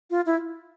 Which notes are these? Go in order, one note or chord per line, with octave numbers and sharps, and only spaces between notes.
F4
E4